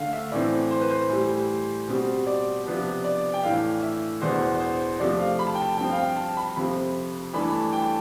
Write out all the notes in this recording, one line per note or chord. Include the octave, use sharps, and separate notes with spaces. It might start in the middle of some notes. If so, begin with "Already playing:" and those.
Already playing: D2 D3 A3 F5
E5
A2 E3 A3 C4 D5
C5
B4
C5
A2 E3 G3
B2 G3 C4
D5
C3 F3 B3 D4
D5
G5
A2 E3 A3 D4 F5
E5
E2 B2 B3 D4 C5
C5
C3 F3 A3 C4 D5
F5
B5
A5
G5
A5
G2 F3 C4 G5
F5
G5
A5
B5
F2 C3 F3 C4 B5
G2 E3 A3 D4 B5
A5
B5
G5
A5